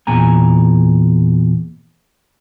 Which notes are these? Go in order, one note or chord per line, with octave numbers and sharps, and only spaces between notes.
E2 A#2 G#5 A#5